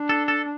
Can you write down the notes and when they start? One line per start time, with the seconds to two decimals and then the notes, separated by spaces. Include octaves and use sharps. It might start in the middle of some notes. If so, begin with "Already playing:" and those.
Already playing: D4
0.09 A4
0.28 A4